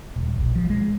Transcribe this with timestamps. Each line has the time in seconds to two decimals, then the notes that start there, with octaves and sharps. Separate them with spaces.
0.16 D#1
0.39 A#1
0.56 F3
0.70 G#3